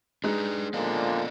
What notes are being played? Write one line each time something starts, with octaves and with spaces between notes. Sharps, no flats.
G#3 D4 D#4 B4
A#2 D3 F3 B3 D5 D#5